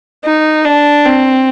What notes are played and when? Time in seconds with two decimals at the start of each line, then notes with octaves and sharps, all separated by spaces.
0.25 D#4
0.65 D4
1.05 C4